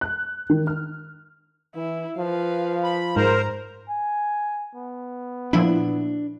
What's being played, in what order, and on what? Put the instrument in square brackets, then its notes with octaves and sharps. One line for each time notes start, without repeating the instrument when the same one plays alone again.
[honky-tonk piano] F#6
D#3
F6
[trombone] E3 [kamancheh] E4
[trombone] F3 [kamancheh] B4 F5
[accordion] B5
[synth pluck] G#2 [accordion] A#4 C5 [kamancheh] A#5
[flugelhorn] G#5
B3
[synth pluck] A#2 F3 E4 [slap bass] D4